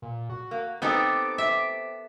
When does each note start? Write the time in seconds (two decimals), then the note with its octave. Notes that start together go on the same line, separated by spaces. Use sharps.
0.02 A#2
0.30 F#4
0.51 A#3
0.82 B3 C4 D#4 G4 A4 D6
1.38 E5